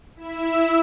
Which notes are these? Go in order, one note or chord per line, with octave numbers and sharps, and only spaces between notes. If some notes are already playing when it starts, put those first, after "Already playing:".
E4 E5 E6